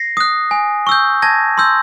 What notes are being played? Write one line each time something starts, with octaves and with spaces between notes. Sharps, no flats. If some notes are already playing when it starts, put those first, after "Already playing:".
Already playing: A#6 C7
D#6 F#6
G#5
C#6 E6 G6
A5 G#6 A#6
C6 E6 G6